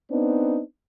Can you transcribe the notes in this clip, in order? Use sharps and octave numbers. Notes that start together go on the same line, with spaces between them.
B3 C4 D4 D#4